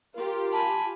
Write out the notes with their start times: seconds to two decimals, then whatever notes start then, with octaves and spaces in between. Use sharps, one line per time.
0.15 F4 G4 A#4
0.53 G#5 A5 B5